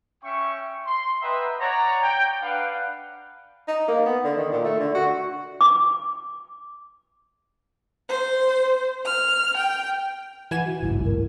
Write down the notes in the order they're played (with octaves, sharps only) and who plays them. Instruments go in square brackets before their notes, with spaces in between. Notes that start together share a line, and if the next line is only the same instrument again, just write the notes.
[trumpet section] C#4 E5 G5 C#6
C6
B4 D#5 E5 F#5 G5 A#5
C#5 D5 F#5 A#5
G5
D4 B4 F5 F#5
[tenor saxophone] D#4
A#3
B3
D3
D#3
A#2
A3
D3
F#4
[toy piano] D6
[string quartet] C5
F6
G5
[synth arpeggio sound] E3 G#5 E7 [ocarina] F#5
[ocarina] F#4
[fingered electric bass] G#1 C#2 G2 [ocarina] E4
[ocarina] A#4